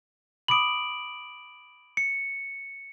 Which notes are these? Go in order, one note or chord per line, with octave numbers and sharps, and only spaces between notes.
B5 D6 D#6 D7 F#7
C#7